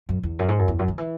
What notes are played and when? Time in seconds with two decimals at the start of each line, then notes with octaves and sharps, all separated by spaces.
0.09 F#2
0.23 E2
0.39 F#2
0.49 G#2
0.59 F#2
0.68 E2
0.79 F#2
0.88 D#3
0.98 E3